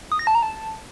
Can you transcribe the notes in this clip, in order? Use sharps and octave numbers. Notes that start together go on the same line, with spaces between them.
D#6
A#6
A5
A#5
A5